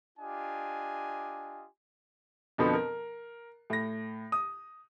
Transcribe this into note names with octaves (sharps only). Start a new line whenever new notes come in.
D4 F4 G4 D#5 G#5
F2 B2 D3 F3 B3
A#4
A2 A#6
D#6